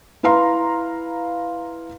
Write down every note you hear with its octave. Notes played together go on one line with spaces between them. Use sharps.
E4 B4 F5 A#5 C6